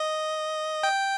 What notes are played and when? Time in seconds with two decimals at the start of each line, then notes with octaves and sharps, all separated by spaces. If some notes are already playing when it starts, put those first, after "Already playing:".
Already playing: D#5
0.83 G5